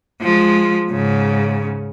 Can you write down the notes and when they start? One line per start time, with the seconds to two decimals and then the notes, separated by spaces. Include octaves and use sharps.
0.21 F3 G#3
0.91 G#2 C#3